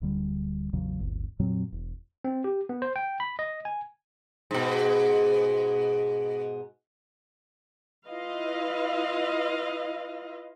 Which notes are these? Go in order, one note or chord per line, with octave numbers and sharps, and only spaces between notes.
D1 D3 G3
A1 E2 C#3 F#3
D1 G1
F2 A#2 F#3 C4
E1
C4
G4
B3
C5
G5
B5
D#5
G#5
G#2 B2
E4 F4 B4 D#5 F5